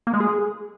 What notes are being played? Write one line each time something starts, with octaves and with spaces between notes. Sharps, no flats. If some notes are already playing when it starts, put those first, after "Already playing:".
A#3
G#3
G#4